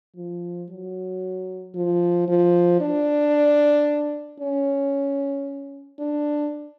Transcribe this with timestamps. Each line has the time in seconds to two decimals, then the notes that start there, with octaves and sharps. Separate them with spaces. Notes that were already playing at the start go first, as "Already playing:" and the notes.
0.17 F3
0.69 F#3
1.75 F3
2.28 F3
2.81 D4
4.40 C#4
5.99 D4